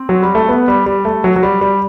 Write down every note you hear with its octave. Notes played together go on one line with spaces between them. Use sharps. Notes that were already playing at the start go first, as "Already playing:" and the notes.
Already playing: C4
F#3
G3
A3
B3
G3
G3
A3
F#3
F#3
G3
G3